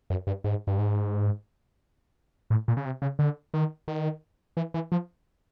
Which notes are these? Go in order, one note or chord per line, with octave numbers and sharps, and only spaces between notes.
F#2
G2
G#2
G2
G#2
A2
A#2
C#3
C3
C#3
D3
D#3
D#3
E3
E3
F3